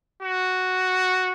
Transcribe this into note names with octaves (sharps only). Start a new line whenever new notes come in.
F#4